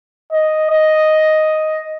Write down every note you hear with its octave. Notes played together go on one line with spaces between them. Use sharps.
D#5
D#5